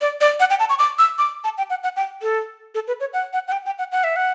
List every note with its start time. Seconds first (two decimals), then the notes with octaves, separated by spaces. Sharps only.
0.01 D5
0.21 D5
0.40 F#5
0.50 G5
0.60 A5
0.70 C#6
0.79 D6
0.99 E6
1.18 D6
1.44 A5
1.58 G5
1.70 F#5
1.84 F#5
1.96 G5
2.22 A4
2.75 A4
2.88 B4
3.00 C#5
3.13 F#5
3.33 F#5
3.48 F#5
3.52 G5
3.66 G5
3.79 F#5
3.92 F#5
4.04 E5
4.16 F#5